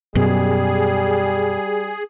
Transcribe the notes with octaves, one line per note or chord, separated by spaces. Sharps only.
F#2 B2 G3 G#4